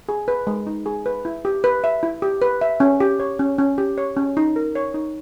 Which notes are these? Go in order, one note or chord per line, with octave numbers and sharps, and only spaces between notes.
G#4
B4
G#3
D#4
G#4
B4
E4
G4
B4
E5
E4
G4
B4
E5
C#4
G4
C#5
C#4
C#4
G4
C#5
C#4
D#4
A#4
C#5
D#4